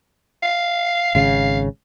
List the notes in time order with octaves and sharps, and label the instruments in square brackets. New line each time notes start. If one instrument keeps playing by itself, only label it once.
[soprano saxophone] F5
[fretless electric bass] G#1 C#3 [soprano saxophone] F5